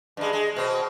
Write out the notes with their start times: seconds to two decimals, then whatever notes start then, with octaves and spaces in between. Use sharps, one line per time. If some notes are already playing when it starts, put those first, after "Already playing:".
0.17 G2 G#3
0.33 G#3
0.56 B2 C4